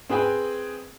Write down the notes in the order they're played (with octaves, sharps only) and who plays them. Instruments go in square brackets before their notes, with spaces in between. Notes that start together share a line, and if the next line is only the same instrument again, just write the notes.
[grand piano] C4 G#4 B4 G5 G#5